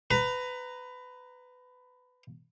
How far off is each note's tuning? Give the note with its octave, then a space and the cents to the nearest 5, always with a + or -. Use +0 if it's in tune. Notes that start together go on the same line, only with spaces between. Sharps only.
B4 +20 A#5 +0